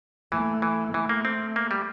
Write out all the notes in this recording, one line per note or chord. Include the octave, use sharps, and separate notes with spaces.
E3 A3
E3
E3 A3
A#3
C4
A#3
G3